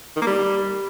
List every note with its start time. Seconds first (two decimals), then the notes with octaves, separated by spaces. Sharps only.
0.16 D#3
0.21 A#3
0.27 G3